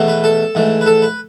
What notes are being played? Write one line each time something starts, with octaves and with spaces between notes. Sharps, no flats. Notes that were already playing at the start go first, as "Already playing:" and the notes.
Already playing: E2 B2 A3
B4
A4
G#2 E3 A3
B4
A4
B4